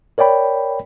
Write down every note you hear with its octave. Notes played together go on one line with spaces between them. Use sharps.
A#4 C#5 D5 G5 B5